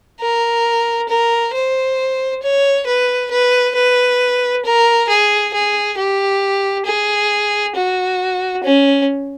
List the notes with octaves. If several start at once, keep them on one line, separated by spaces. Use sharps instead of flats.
A#4
A#4
C5
C#5
B4
B4
B4
A#4
G#4
G#4
G4
G#4
F#4
C#4